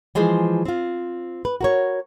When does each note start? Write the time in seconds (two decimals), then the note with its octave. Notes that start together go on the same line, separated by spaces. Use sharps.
0.15 E3 F3 G#3 G#4 C5
0.65 C4 F4
1.45 B4
1.61 F#4 A#4 C#5